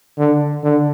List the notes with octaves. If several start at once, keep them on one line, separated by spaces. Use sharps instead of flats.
D3
D3